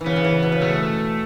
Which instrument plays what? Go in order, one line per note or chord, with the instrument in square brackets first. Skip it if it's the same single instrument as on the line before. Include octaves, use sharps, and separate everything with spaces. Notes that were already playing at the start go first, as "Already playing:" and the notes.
[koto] E3
[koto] C#3 [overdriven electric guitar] B3
[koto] C#3
E3
B2
C#3
[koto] B2 [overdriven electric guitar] A3